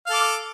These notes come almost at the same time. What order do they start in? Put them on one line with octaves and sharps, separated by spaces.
F5 A4 D6